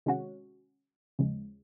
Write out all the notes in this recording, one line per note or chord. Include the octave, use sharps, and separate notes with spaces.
C3 D#3 G#3 C#4 F#4
D#2 C#3 F3 G#3